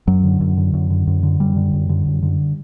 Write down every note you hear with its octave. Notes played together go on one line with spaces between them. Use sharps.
F#2 F#3
D3
F#2
D3
F#2
D3
F#2
D3
F#2 G3
D3
F#2
D3
F#2
D3